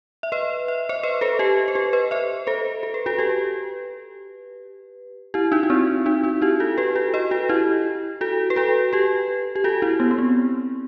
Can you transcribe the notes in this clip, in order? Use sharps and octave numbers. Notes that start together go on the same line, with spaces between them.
E5
B4 D#5
E5
C5 E5
B4 D#5
A4 C5
G4 B4
C5
G4 B4
B4 D#5
C5 E5
A4 C5
A4
B4
F#4 A4
G4 B4
E4 G4
D#4 F#4
D#4
C4 E4
D#4 F#4
D#4 F#4
E4 G4
F#4 A4
G4 B4
F#4 A4
B4 D#5
F#4 A4
E4 G4
F#4 A4
B4
F#4 A4
G4 B4
G4
F#4 A4
E4 G4
B3
B3
C4